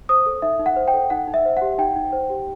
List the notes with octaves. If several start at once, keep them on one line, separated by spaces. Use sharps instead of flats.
C5 D#6
A4
D#4 E5
D#4
F#5
C5
G5
A4
D#4 F#5
D#4
E5
C5
G4 F#5
D#4 G5
D#4
C5
G4